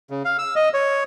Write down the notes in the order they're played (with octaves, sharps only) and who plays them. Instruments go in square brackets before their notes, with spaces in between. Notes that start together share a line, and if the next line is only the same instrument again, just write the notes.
[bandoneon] C#3
F5
E6
D#5
C#5